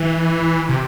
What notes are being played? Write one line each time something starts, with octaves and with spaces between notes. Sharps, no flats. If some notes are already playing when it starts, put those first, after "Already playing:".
Already playing: E3
C3